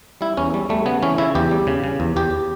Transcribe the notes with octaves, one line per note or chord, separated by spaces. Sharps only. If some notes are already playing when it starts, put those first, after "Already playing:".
G3 E4
E2 C#4
G3
G3 A3
C#3 B3
E3 C#4
C#3 E4
E2 G4
G3
C#3
C#3
E2
E2 G4